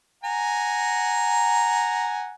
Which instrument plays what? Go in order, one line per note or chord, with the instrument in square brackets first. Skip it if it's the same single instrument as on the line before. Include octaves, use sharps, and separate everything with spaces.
[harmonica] F#5 G#5 A#5